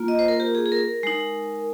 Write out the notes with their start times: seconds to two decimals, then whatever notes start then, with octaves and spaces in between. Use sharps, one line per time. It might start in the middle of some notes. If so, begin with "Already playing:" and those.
Already playing: A#3 F4
0.08 D#5
0.19 C5
0.28 A#4
0.40 G4
0.55 G#4
0.66 G#4
0.72 A#4
1.03 G#3 D#4